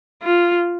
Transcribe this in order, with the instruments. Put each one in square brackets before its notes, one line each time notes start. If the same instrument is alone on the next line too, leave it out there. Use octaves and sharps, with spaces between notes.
[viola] F4